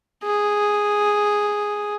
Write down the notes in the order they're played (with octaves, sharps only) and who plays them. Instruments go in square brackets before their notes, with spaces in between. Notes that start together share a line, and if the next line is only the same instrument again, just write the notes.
[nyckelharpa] G#4